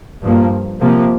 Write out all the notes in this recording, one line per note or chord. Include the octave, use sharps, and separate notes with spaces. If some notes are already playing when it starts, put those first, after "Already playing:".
G2 F3 A#3
C3 F3 A#3